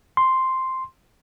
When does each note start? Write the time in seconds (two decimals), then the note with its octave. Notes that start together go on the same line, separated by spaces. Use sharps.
0.17 C6